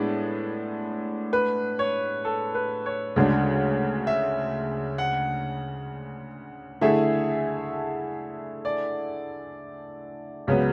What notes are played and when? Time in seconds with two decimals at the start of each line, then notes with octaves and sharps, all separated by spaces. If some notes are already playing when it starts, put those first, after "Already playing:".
Already playing: A2 G#3 B3 D4 D5
1.33 B4
1.79 C#5
2.25 A4
2.55 B4
2.86 C#5
3.16 D2 C#3 G#3 D4
4.07 E5
4.98 F#5
6.81 D3 A3 E4 G#4 E5
8.65 D5
10.47 C#2 C#3 F#3 B3